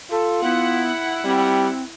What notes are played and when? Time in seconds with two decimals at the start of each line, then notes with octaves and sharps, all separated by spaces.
0.11 F4 A4
0.44 B3 E4 F#5
1.25 G3 C4